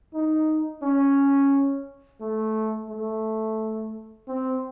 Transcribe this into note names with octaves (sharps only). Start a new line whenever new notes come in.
D#4
C#4
A3
A3
C4